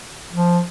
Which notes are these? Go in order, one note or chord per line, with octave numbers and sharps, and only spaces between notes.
F3